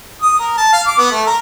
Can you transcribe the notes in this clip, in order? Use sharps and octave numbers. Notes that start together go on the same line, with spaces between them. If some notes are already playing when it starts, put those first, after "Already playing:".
D#6
A#4
A5
F5
D6
B3
A3
A#4